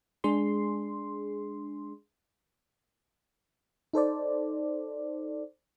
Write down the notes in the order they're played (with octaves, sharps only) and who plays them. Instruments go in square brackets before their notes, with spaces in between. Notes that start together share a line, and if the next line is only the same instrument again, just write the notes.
[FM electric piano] G#3 D4 G#4 C6
D#4 A4 C5 D5